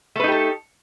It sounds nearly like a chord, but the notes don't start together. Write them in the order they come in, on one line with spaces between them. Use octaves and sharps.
A3 B4 D#4 G4 A4